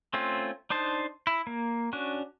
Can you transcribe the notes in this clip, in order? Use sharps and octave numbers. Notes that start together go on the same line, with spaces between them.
A3 C4 C#4 F4
D4 D#4 C5 A5
E4
A#3
C#4 D4 F#4